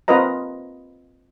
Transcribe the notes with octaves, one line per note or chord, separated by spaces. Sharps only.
C4 F4 A#4 B4 D#5 A#5